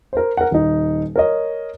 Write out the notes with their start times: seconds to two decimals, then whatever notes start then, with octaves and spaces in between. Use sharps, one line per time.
0.13 A#4 C5
0.37 A#4 F#5
0.51 D#1 D#4
1.16 A#4 C#5 D#5